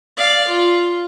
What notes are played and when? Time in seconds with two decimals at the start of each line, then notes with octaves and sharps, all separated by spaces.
0.17 D5 F5
0.47 F4